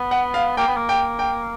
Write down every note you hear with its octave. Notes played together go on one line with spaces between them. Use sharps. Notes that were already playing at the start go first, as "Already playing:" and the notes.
Already playing: B3
F#5
F5
A#3 G5
B3
A#3
G5
G5